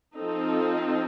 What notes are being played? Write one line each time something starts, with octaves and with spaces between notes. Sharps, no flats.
F3 C4 D#4 A4